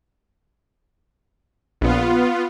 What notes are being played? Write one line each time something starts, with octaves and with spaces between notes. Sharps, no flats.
A#1 A#2 B3 F4